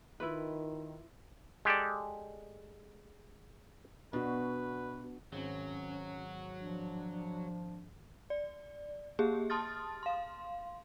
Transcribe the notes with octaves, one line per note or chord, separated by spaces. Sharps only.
D#3 E4 F4 B4
G#3 G4 A4 D5
B2 D4 F#4 B4
G#1 F#3 C4 C#4
F3 D4
D5
A#3 G4 G#4
A5 C6 D#6 F6 A6
F5 C6